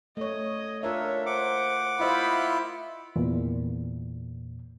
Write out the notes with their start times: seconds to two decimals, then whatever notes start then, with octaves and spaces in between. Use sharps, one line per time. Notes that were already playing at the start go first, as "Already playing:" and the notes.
0.17 A3 C#5 D#5
0.83 D4 F4 A#4 C#5 E5
1.26 C5 F#5 D6
1.99 E4 F4 C5 D#5 F5 B5
3.16 E2 A#2